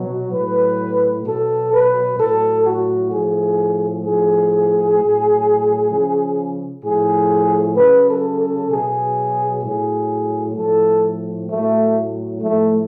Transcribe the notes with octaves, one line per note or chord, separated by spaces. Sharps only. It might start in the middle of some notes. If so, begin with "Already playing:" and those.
Already playing: B2 F#3
A2 F#3 B4
B2 F#3 A4
B4
A2 F#3 A4
F#4
A2 F3 G#4
A2 F3 G#4
A2 F#3
C#3 F3
A2 F3 G#4
C#3 F#3 B4
A4
A4
B2 F#3 G#4
A2 F#3 G#4
A2 F3 A4
A2 F#3 A3
A2 F3 A3